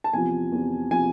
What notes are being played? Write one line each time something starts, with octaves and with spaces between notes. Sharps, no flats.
A5
E2 C3 F3 G#5
E2 C3 F3
C3 F3 G#5